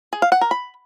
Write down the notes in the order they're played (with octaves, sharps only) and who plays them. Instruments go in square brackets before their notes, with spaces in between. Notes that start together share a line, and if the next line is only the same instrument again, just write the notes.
[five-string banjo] G#4
F5
F#5
A#4
B5